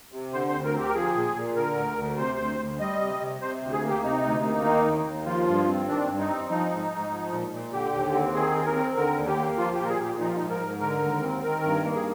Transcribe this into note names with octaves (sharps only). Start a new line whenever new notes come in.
C3
D3 C5
C5
D2
A#4
C4 G4
A#4
F3 G#4
A#2
A#2
D3 A#4
D2
D2
C3 C5
D2
D2
G3 D#5
C3
C3
C3 C5
D2
G#4
A#3
G4
C3 D#4
D2
A#3
D#3
D#2
D#2
F3 F4
G2
C4
D#3 D4
G2
D#4
C4
F3 D#4
G#2
G#2
F3
A#2
A#2
D3 G4
D#2
C4
D#3 G#4
D#2 G#4
A#4
C4
D3 A#4
D#2
G4
A#3
F3 F4
A#2 G4
A#4
G#4
A#2 G4
F3 D#4
F4
G#2 D#4
A#4
G#2
D3 A#4
D#2
C4
D#3 A#4
G2
A#3
G#4